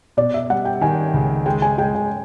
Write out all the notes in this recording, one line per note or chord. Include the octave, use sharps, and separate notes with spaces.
B2 D5
E5
G3 F#5
G5
D#3 G#5
C#2
G#3 G5
G#5
G#3 G5
G5